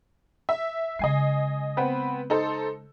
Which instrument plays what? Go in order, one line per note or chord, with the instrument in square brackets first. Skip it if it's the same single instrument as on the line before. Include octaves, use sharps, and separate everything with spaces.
[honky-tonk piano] E5
[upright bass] C#3 G#3 [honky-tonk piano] D#5 G#5 C7
[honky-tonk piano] B3 C4 B4
D#4 A4 C5